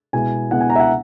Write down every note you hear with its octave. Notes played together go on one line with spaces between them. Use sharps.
B2 G#3 B3 E4 G#5
B2 G#3 B3 E4 F#5
G#5
A#5
E5
F#5